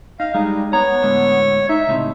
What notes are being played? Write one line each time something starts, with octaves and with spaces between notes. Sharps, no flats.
D#4 F5
G3 G#3 D#4
B3 C#5 A#5
A2 D3 G#3
D#4 E5
C#2 A2 C3